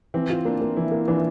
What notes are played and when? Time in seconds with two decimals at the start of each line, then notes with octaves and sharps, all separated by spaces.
0.14 E3 C4
0.30 F4
0.45 A#3 D4
0.61 A#3
0.76 E3 E4
0.92 A#3
1.08 E3 D4